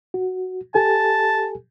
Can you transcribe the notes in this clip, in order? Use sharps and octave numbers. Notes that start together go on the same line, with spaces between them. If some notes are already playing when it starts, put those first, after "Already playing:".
F#4
G4 A4 G#5 A5